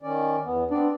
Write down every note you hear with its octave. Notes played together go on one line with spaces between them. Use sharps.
D#3 C#4 D5
E2 B3
B3 C4 D4 D5